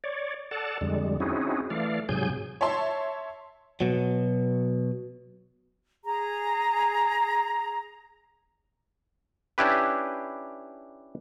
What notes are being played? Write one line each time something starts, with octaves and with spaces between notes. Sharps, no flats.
C#5 D5
A4 D5 F#5 A5
F2 D3 G3 G#3
C4 C#4 D#4 E4 F#4 G#4
E3 A3 D5 F5
G#2 C3 F#3 G#4 G#5 G6
C#5 E5 A5 C6
B2 F#3
G#4 A#5
C#4 D4 E4 G4 B4